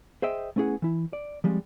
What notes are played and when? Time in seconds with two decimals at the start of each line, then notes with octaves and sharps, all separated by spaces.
0.22 G#4 C5 D#5 E5 G5
0.56 A3 B3 C#4 E4 G#4 F#5
0.82 E3 E4
1.13 D5
1.44 F3 G3 G#3 C4